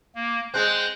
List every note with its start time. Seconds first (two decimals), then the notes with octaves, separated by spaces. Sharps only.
0.15 A#3
0.54 G#3 C4 F#6 G6